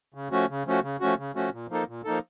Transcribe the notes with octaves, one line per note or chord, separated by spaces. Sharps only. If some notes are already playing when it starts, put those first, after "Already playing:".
C#3
F3 A3 C#4 F#4
C#3
F3 A3 C#4 F#4
C#3
F3 A3 C#4 F#4
C#3
F3 A3 C#4 F#4
A#2
F3 A#3 D#4 A4
A#2
F3 A#3 D#4 A4